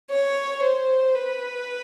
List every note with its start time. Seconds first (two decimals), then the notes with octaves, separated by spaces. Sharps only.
0.10 C#5
0.62 C5
1.15 B4